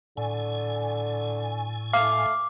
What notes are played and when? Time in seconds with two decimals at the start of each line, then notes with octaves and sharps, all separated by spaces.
0.17 A2 D3 G#5
1.93 A3 F5 D6